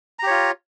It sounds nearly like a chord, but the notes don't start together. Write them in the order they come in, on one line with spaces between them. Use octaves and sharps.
A#5 G4 C#5 F4